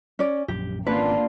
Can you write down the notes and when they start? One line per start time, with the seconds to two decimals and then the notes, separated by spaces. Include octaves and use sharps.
0.19 C#4 D5
0.48 A#1 F#2 G4
0.87 G#1 D3 A#3 C4 C#4 F4 B4